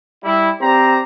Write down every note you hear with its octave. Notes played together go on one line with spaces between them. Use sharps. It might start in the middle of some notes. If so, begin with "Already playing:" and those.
G3 E4
C4 G4 C5 D5 A#5